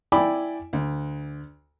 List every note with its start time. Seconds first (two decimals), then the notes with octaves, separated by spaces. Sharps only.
0.12 E4 D5 G5 G#5 B5 D6
0.73 D2